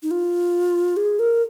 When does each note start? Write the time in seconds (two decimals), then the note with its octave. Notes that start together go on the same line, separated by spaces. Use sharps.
0.03 D#4
0.11 F4
0.97 G#4
1.19 A#4